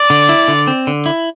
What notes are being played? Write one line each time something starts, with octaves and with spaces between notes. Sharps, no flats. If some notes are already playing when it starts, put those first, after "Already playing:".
Already playing: D5
D3
E4
D3
C4
D3
E4